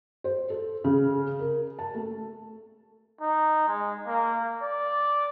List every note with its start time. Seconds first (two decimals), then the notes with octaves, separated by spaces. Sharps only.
0.24 C5
0.50 A4
0.84 C#3
1.39 A#4
1.79 A5
1.95 A3
3.21 D#4
3.68 G#3
4.07 A#3
4.62 D5